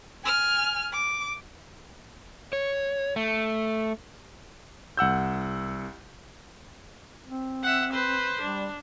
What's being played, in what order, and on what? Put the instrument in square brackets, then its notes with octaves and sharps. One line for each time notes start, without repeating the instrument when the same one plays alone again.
[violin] G#5 F6
D6
[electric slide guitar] C#5
A3
[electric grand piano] C2 F#5 E6 G6
[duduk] C4
[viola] E5 F#5
B4 C5
[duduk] G3 [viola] D4